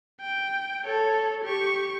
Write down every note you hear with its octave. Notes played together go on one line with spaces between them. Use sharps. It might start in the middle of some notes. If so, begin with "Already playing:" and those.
G5
A4 C#5
G4 C#6